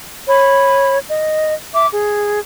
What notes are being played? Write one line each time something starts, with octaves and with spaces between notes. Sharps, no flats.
C#5 B5
D#5
E5 D6
G#4